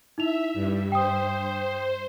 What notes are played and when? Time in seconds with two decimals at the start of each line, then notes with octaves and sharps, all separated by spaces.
0.18 D#4 E4 E5 F7
0.54 G2
0.92 C5 G5 D#6